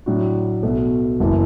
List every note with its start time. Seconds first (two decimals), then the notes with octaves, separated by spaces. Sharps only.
0.06 A2 F#3 D4 F#4
0.63 B1 B2 A3
1.20 F#1 E3